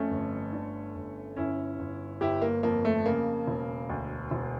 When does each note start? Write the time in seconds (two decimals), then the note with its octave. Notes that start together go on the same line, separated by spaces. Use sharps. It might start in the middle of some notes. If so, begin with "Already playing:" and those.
Already playing: F2 A3 C#4
0.11 G1
0.53 D3
0.95 G1
1.37 G1 C#4 E4
1.79 G1
2.21 G1 E4 G4
2.42 A#3
2.63 F2 A#3
2.85 A3
3.05 C#3 A#3
3.47 E1
3.89 D2
4.31 E1